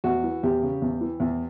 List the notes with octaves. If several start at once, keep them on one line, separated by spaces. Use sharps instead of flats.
E2 F#4
E3
E2 G4
C#3
E2
E3
E2